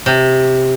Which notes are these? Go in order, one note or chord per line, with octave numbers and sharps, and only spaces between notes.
C3